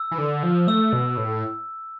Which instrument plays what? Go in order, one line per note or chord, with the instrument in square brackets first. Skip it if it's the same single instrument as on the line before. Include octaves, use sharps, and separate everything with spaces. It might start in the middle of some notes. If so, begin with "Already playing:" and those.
Already playing: [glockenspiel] E6
[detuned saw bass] E3
D3
F3
[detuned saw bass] A3 [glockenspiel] E6
[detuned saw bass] B2
A2